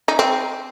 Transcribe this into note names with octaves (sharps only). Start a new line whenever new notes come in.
D#4
C4